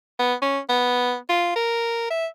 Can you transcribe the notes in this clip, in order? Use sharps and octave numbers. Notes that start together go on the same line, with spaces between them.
B3
C#4
B3
F4
A#4
E5